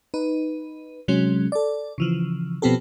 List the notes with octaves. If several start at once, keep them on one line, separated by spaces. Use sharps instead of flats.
D#4 B4
C3 F#3 G#3 C#4
A4 D5
C#3 E3 F3
B2 F3 B3 C4 G4 A4